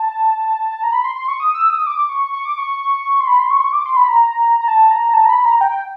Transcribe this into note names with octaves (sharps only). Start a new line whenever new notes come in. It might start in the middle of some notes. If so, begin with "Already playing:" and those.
Already playing: A5
A#5
B5
C6
C6
C#6
D#6
E6
D#6
D6
C#6
C#6
D6
C#6
C6
B5
C6
C#6
C6
C#6
D6
C6
B5
A#5
A#5
A5
A#5
A5
A#5
B5
A#5
G5